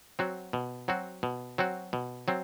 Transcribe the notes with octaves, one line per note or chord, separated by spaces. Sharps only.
F#3 C4 F#4
B2
F#3 C4 F#4
B2
F#3 C4 F#4
B2
F#3 C4